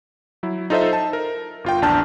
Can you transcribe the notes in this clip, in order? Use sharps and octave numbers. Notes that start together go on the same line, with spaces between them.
F#3 E4
D#4 F4 A4 C5 D#5 E5
A5
A#4
G1 F4 G5
A#1 E2 D4 A5 F6 G6